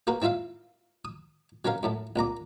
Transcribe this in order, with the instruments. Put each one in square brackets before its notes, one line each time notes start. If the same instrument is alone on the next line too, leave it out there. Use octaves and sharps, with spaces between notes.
[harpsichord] A#3 F#4 A#4 B4
C4 E4 F4 E5 F5
D#6
F#3 C4 C#4 A#4 F5
F#2 A2 A3
C2 A#2 A#5 D6